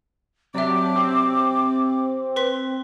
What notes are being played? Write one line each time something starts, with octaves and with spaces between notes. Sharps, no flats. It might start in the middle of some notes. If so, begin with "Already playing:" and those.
C3 F#3 D4 G4 D5 E5 D6
C4
B4 C6 B6